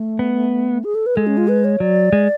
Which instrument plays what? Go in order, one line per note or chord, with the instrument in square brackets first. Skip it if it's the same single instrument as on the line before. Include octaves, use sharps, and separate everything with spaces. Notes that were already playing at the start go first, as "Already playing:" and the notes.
Already playing: [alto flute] A3
[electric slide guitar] B3
[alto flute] G#4
A4
B4
[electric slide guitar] G#3 [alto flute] A4
[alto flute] C#4
F4
B4
C#5
[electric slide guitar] F#3 [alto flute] D5
[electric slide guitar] G#3